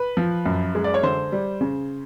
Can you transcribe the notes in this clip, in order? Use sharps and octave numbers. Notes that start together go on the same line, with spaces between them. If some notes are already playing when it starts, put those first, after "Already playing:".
Already playing: B4
F3
F#2
G#3
D5
C#5
D3 C5
G3
C#3